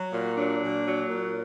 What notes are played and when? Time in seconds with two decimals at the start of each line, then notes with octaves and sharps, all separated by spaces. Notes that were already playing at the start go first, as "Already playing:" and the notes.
Already playing: F#3
0.13 A#2
0.37 F#3 D4
0.62 A#2
0.85 F#3
1.08 A#2